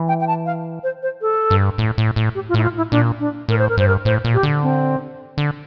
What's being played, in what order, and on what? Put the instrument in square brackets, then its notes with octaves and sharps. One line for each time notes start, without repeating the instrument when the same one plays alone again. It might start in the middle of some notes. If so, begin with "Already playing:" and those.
Already playing: [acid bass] E3
[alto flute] G5
G5
A5
F5
C5
C5
A4
[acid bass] G2
A2
A2
A2
[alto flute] G4
F4
[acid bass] A2 [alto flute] E4
[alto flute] F4
E4
[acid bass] A#2 [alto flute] D4
[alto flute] D4
[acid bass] A2 [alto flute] A#4
[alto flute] C5
A#4
[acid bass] G2 [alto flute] C5
[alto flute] A#4
[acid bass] A2 [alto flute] C5
[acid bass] A#2
[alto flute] G4
[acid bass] D3
[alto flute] C4
[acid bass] D3